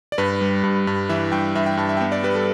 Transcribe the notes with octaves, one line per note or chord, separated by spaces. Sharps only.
D5
G2 B4
G3
G2
G2
E3 E5
G2 G5
G2 E5
G5
G2 A5
E5
G5
B3 E5
D5
G3 B4
A4